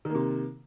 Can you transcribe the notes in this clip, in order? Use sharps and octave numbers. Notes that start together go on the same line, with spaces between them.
C3 D#3 A#3